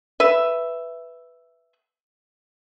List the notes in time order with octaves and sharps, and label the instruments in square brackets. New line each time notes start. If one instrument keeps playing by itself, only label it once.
[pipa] B4 E5